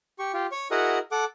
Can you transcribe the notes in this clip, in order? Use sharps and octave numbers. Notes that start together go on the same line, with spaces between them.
G4 C#6
F4 G4
C#5 C#6
E4 F#4 G#4 A#4 D#5 F#5
A4 F#5 D6